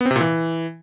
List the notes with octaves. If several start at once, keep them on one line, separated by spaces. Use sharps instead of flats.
B3
C4
C3
A#2
E3